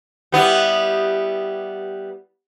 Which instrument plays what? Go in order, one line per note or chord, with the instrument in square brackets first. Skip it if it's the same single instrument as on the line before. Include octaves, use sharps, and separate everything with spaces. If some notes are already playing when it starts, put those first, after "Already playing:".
[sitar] G3 B3 E4